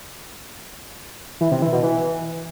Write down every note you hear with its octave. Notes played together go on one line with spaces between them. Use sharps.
E3
C3
E3
B2
E3